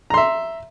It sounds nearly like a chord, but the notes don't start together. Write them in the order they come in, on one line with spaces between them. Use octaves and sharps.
A#5 C6 E5